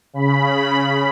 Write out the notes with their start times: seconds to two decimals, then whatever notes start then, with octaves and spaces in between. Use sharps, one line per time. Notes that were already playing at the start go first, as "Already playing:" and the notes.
0.13 C#3 B5